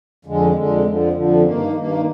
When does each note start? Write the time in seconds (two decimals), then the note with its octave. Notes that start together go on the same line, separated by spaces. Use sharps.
0.25 F2 D3 G#3
0.54 F2 D3 G#3
0.83 F2 D3 F3
1.13 F2 D3 F3
1.42 G2 D#3 A#3
1.72 G2 D#3 A#3